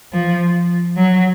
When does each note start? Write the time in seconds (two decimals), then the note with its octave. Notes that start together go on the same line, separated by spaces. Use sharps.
0.13 F3
0.97 F#3